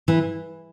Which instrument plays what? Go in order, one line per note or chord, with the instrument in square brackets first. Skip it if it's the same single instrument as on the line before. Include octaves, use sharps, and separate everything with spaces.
[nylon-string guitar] E3